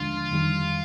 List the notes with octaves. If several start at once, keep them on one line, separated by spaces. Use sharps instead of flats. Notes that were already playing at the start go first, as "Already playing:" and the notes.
Already playing: D#2 D3 F3 G#3 D4 F4
F2 D#3 G3